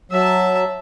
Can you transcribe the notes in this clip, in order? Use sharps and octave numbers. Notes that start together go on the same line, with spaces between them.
F#3 E5 A5